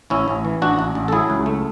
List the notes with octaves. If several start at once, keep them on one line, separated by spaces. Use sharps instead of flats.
A1 C#4 E4
A1
E3
A1 D4 F#4
A1
A1
A4
F#3 E4 G#4
C#2
A3